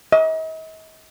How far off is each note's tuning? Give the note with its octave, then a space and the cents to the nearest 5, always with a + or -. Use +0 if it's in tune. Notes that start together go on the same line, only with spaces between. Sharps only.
D#5 +40